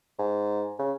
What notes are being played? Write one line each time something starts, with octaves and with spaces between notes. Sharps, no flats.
G#2
C#3